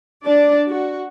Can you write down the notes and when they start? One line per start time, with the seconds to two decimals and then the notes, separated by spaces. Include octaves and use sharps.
0.23 D4 D5
0.67 F#4